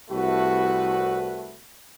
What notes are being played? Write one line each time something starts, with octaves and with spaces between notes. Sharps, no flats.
C2 A3 F#4 B4